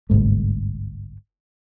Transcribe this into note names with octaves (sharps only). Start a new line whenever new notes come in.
G1 C2 G#2 A3